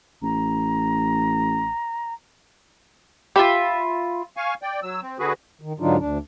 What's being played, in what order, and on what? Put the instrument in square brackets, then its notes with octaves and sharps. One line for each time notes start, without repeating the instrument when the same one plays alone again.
[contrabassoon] A1 [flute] A#5
[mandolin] F4 E5 B5 [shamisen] G4
[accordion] F5 G#5 C#6
D5 G5
F#3 E6
C4
D3 F#4 G#4 B4
[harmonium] D#3
G#2 D3 F#3 D4 D#4 F4
D2 D4